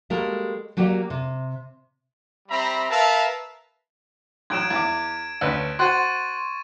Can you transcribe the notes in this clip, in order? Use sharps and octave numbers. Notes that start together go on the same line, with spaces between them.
G3 G#3 A#3 F#4 A4 A#4
F#3 A#3 F#4 G4 D5
C3
G3 C4 E5 A#5 B5
A#4 B4 E5 F5 A5 A#5
A1 F#3 G#6 D7 E7
E2 D6
D2 C#4 B4
F#4 C5 F#5 C6 C#6 A6 D#7